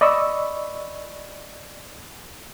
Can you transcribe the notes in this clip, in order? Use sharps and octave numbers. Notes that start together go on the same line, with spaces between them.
D5 D#5 B5 C#6 E6